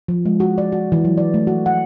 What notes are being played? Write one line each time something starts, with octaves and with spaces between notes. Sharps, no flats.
F3
G#3
F#4
D5
F#4
E3
F#3
D5
A3
F#4
F#5